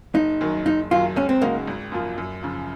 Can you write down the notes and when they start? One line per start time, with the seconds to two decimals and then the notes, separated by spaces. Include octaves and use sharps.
0.14 F#1 D#4
0.41 F#2 D#3 F#3
0.66 F#1 D#4
0.91 F#2 D#3 F#3 F4
1.17 C#2 C#4
1.29 C4
1.41 C#3 G#3 A#3 D#4 F#4
1.68 G#1
1.92 F#2 F3 A#3 F4
2.18 F#2
2.43 C#3 F3